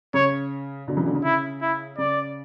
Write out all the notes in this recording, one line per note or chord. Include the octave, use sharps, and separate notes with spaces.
C#3 C#5
B2 D3
C#3 E3
B2 D3
C#3
E4
E4
C#3 D5